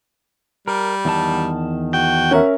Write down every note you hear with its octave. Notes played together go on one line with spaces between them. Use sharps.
G3 A#4
E2 D#3 A5
F#4 G5
C#4 A#4 E5